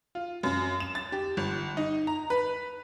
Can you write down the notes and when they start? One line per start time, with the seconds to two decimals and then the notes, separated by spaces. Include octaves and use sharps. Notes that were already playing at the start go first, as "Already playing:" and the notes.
0.15 F4
0.43 F#2
0.80 E7
0.95 A6
1.12 G4
1.37 G1
1.77 D#4
2.07 A#5
2.30 B4